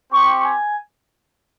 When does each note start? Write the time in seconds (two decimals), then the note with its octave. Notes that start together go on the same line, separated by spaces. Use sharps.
0.12 C4 G4 C#6
0.42 G#5